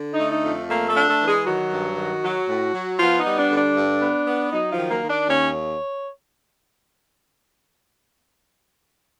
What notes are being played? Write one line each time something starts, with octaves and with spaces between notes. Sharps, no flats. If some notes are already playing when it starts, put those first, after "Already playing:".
Already playing: D3
D#4
A3
D#4
F2
A3 A#3 A#4
A3 A4
D4
A3 A4
E3
G#3 G#4
D#3 F#3 F#4
G2
D#3
F#3
A2
F#3
F3 B3 F4
D#4
G3
D4
D3
D4
G2
B3
B3
F#3 D#4
F3 F4
D#3
A#3 A#4
D#3
D4 D5
D#2 C#4 C#5